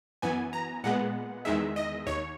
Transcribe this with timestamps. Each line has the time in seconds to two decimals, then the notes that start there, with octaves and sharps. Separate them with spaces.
0.22 F#2 E3 B3 G#5
0.53 A#5
0.84 A#2 G#3 B3 F#5
1.45 E2 D#3 G#3 E5
1.76 D#5
2.06 D#2 C#5